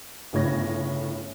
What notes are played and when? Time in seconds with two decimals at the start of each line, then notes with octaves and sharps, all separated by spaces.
0.33 G1 A2 C#3 C#4 G#6 A#6